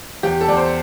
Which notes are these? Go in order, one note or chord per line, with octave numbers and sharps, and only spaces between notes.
E2 G4
A4
E2 D5
C5